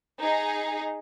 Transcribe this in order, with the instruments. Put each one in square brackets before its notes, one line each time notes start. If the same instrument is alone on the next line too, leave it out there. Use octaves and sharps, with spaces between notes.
[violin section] D#4 G#4